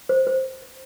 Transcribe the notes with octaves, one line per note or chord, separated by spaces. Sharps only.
C5
C5